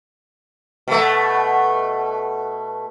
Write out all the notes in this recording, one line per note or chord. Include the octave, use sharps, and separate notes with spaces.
B2 A3